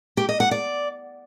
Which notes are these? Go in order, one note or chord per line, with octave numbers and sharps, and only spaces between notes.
G4
D#5
F#5
D5